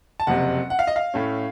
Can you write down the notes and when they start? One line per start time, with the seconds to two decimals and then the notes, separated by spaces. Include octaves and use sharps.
0.20 A5
0.27 F#1 F2 C3 F#5
0.70 F#5
0.79 F5
0.87 D#5
0.96 F5
1.14 A2 A3 C#4